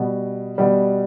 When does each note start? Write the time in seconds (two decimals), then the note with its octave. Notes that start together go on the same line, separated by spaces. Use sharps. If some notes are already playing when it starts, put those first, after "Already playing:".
Already playing: B2 G3
0.58 B2 G3